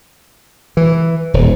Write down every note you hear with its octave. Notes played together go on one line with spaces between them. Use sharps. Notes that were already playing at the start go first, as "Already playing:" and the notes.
E3
D#1